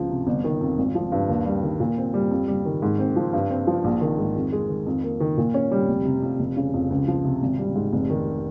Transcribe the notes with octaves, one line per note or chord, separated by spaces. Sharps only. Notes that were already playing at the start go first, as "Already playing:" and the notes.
Already playing: C#2 F3
C3
G1
D#3
F2
G#1
F3
G2
D#2
G3
D#3
A#2
C4
G3
F2
G3
D#3
G#2
C4
F3
G2
C4
F3
A#1
D#3
G#2
F2
G#3
D#3
F2
A#3
D#3
A#2
C#4
G3
F1
C3
F2
F1
C#3
F2
C#2
F3
C3
G#1
G3
G#2
F1
D#3